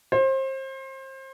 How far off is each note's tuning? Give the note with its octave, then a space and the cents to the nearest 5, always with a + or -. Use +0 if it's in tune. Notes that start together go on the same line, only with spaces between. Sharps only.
C5 +30